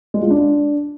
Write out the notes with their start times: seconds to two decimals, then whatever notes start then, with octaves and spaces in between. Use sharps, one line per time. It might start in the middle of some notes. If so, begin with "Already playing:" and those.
0.14 G#3
0.22 F4
0.30 D4